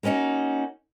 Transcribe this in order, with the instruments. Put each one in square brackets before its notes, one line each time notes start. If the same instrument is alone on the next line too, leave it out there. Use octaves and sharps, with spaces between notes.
[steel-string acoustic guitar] A#3 B3 C#4 D#4 F#4